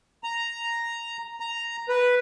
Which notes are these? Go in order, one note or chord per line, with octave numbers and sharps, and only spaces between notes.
A#5
A#5
B4